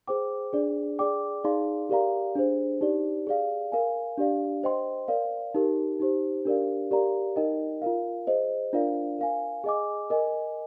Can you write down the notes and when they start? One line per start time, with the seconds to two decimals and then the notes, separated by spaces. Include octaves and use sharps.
0.07 G#4 C5 G5 D6
0.53 D4 G#4 D5
0.99 G#4 D5 G5 D6
1.44 D#4 G#4 D5 F5 C6
1.89 G4 A#4 D5 F5 A#5
2.35 D4 G#4 C5
2.81 D#4 G4 D5
3.27 G#4 D5 F5
3.72 A#4 F5 G#5
4.17 D4 G4 D5 F5
4.63 C5 D#5 G5 C6
5.08 A#4 D5 F5
5.54 D#4 G4 A#4
6.00 D#4 G4 C5
6.45 D4 G4 A#4 D5 F5
6.91 G4 A#4 D5 F5 A#5
7.36 D#4 A#4 D#5 G5
7.82 F4 A#4 F5
8.27 G#4 C5 D#5
8.73 D4 F4 A#4 D5 F5
9.19 A#4 F5 G#5
9.64 G#4 D#5 G#5 D6
10.10 A#4 D#5 G#5